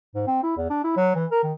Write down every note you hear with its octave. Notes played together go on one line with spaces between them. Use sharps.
G#2
C4
E4
E2
D4
E4
F#3
E3
A#4
D#3